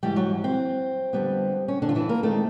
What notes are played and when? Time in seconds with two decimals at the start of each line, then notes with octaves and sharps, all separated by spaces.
0.03 G#2 E3 G3 A3 G4
0.16 F#3 F#4
0.44 C4
1.13 F2 D3 G3 B3
1.68 C#4
1.82 D3 D4
1.89 F4
1.95 E3 E4
2.09 A#3 A#4
2.23 D#3 G#3 A3 C4 A4